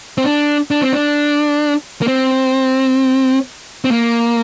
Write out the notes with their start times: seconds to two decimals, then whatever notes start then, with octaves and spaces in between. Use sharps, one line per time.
0.18 C4
0.24 D4
0.71 D4
0.82 C4
0.93 D4
2.02 A#3
2.08 C4
3.85 C4
3.91 A#3